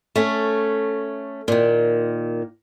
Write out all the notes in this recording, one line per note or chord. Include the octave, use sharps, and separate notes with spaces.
A3 C#4
A#2 D#3